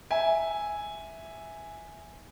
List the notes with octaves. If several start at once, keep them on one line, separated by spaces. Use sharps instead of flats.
E5 G#5